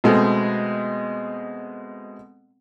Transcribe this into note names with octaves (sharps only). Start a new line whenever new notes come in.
B2 G#3 A3 B3 C4